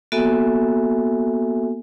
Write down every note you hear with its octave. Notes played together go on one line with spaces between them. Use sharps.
A#3 B3 F#4 A4 E5 G#5